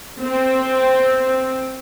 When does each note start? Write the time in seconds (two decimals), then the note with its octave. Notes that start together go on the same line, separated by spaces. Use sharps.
0.20 C4